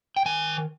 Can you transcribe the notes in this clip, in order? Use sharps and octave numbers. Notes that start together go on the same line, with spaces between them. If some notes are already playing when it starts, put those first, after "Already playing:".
G5
D#3 G#5